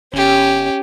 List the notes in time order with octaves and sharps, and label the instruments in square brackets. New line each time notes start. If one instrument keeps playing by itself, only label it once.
[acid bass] G1 [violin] C#4 G4